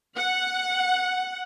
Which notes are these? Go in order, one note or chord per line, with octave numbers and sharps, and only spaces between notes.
F#5